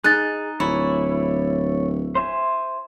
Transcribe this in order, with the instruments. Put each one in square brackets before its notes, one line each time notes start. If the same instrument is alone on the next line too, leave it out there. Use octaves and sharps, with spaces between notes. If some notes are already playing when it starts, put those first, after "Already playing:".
[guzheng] D#4 [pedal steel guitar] G#4 [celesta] F#6 A6
[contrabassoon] D1 [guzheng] E4 [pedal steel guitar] C#5 D5 G#5
[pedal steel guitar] C5 E5 G#5